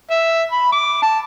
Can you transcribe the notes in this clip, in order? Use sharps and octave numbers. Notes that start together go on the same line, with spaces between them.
E5
B5
D6
A5